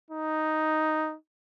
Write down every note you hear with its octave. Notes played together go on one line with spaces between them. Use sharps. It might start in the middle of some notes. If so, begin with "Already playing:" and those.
D#4